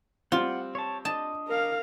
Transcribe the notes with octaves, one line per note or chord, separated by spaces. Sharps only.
G3 C4 F4 F#5
C#5 A5
D4 D#5 A5
A#4 F5